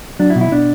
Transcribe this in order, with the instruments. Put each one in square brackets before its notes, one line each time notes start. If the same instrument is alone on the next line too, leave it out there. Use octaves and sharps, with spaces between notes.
[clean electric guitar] F#3 D4
E4
B2
E4
B2 D4